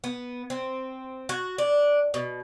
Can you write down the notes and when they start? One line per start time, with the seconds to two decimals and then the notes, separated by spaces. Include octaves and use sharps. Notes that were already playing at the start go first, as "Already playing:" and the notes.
0.04 B3
0.50 C4
1.29 F#4
1.58 D4
2.14 B2